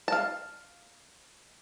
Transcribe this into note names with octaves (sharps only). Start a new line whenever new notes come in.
F5 A5